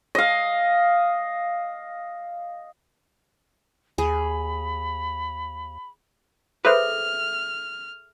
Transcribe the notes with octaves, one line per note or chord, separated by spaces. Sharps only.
D#5 F5
D#2 G#4 B5
G#4 A4 B4 C5 E5 F6